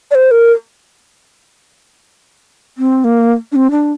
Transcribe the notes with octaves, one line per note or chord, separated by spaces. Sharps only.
D5
C5
A#4
C4
A#3
D4
C4
D4